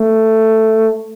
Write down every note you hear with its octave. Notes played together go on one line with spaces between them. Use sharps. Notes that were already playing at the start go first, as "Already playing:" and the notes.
Already playing: A3